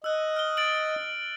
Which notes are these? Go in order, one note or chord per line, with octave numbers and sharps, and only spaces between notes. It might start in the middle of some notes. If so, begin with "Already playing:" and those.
D#5 E6 F#6
F6 G7
A6 D7 F#7